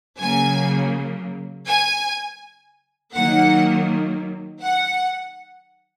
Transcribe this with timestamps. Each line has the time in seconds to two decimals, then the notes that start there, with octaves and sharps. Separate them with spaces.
0.20 C#3 F#3 A#3 G#5
1.67 G#5
3.15 D#3 F#3 A#3 F#5
4.63 F#5